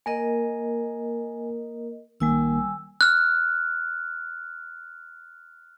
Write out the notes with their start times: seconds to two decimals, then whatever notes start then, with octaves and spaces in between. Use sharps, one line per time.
0.06 A#3 A#4 D#5 G#5
2.20 B1 D#3 G3 A#3 G#5 E6
3.01 F6 F#6